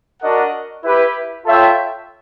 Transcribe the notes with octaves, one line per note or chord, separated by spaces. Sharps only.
D4 F#4 A#4 D#5 F#5
E4 G4 B4
F4 A4 C#5 E5 G5